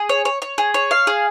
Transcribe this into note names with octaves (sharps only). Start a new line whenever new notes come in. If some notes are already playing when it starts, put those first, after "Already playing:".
Already playing: G#4
C#5
C#5
C#5
G#4
C#5
F5
G#4